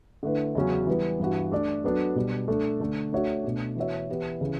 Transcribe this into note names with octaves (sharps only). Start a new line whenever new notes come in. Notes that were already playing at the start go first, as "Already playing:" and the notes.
D3 A3 E4 B4
E2 C#3 F#3 C#4
E3 G3 B3
G2 E3 B3 F#4
A3 D4 A4 D5
F#3 B3 D4 A4
B2 G3 D4
A3 D4 A4
D3 A3 D4
A3 D4 F#4 C#5 E5
B2 A3 D4
E3 B3 F#4 C#5 E5
E3 B3 E4 G4
C#3 E3